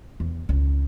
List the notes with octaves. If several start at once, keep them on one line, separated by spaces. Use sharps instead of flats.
E2
C#2 D#4